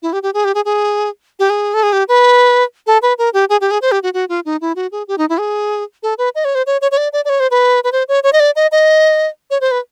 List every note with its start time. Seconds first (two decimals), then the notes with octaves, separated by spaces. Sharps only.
0.02 E4
0.13 G4
0.23 G4
0.34 G#4
0.45 G4
0.55 G#4
0.65 G#4
1.39 G4
1.50 G#4
1.74 A4
1.83 G#4
1.93 G4
2.08 B4
2.87 A4
3.02 B4
3.18 A#4
3.34 G4
3.49 G#4
3.61 G4
3.71 G#4
3.82 C5
3.92 G4
4.03 F#4
4.14 F#4
4.29 F4
4.45 D#4
4.61 E4
4.76 F#4
4.92 G#4
5.08 G4
5.18 D#4
5.29 E4
5.39 G#4
6.03 A4
6.18 B4
6.35 D#5
6.45 C#5
6.55 C5
6.66 C#5
6.81 C#5
6.91 C#5
6.97 D5
7.13 D5
7.25 D5
7.29 C#5
7.40 C5
7.51 B4
7.84 B4
7.92 C5
8.08 C#5
8.24 C#5
8.33 D#5
8.40 D5
8.56 D#5
8.72 D#5
9.51 C#5
9.61 C5
9.71 B4